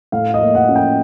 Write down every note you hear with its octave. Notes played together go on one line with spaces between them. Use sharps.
A2 F5
D#5
A#3
F#5
C#4
G5